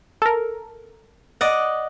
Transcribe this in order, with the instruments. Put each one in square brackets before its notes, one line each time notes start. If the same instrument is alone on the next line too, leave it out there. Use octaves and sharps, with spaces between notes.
[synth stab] A4 A#4
[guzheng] D5 D#5 F#5